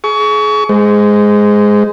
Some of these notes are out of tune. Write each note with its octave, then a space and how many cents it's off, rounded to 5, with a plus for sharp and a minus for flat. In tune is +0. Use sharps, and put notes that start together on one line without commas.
G#4 +30 C#6 +30
G#3 +0 C5 -25